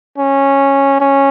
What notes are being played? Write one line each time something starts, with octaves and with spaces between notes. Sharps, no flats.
C#4
C#4